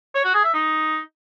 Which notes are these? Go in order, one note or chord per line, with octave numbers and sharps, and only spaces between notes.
C#5
F#4
G#4
E5
D#4